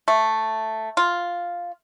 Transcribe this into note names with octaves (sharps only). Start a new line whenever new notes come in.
A3
F4